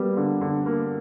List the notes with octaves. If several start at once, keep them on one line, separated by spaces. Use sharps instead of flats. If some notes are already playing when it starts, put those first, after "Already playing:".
Already playing: G3 A#3 B3
D3
D3
A#3